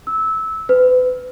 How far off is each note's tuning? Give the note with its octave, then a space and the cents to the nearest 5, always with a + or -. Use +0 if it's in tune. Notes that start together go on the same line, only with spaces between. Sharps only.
E6 -20
B4 +35